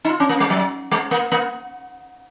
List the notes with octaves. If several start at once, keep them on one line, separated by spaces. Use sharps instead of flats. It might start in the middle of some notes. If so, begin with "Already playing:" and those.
D#4
F4
C#4
A#3
G#3
F#3
G#3
A#3
A#3